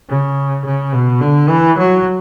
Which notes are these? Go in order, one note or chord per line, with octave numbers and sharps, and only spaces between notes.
C#3
C#3
B2
D3
E3
F#3